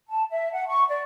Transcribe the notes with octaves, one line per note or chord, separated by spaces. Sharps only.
A5
E5
F#5
C#6
D5